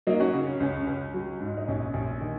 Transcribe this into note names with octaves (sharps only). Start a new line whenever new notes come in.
F#3 A#3 D#4
C#4 F#4
C#3
C#4
C#2 C#4
C#2
F#3
G#2
D#4
A#1 C#4
A#1
D#3